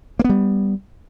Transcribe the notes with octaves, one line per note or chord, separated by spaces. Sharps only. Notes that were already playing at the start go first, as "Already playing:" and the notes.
G3 A#3 B3